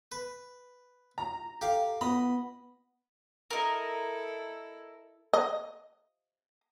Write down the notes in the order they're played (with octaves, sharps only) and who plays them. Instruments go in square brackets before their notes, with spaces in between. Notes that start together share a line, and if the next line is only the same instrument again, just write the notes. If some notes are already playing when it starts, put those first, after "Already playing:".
[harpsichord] B4
[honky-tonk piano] A#5
[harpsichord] G4 F5 [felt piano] A4
[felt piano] B3 [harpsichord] D#5 [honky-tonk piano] B5
[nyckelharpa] E4 A4 [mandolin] A#4 D#5
[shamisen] D#5